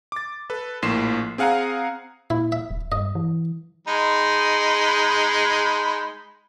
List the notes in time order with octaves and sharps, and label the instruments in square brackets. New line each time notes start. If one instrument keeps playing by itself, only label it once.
[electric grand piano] D6 A6
A4 B4
A#1 A2 A#3 C6 C7 E7
C4 G#4 F5 F#5 G#5 A#5
[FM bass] A#2 [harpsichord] E4
[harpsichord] E5
[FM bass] E1
[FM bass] G2 [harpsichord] D#5
[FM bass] E3
[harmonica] G#3 D#4 B5